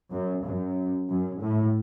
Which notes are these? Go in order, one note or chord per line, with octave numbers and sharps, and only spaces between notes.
F#2
F#2
F#2
A2